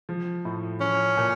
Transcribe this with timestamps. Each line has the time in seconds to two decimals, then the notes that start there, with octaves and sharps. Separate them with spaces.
0.09 F3
0.45 A2
0.80 F3 C#4
1.17 A#2